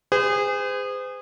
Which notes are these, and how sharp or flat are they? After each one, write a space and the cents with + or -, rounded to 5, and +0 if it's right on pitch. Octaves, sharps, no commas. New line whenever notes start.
G#4 -25 C5 -45